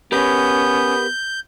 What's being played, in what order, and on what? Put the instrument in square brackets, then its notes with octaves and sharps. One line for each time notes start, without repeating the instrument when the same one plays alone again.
[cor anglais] B3 [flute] C#4 [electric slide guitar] G4 A#4 B4 [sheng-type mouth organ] G6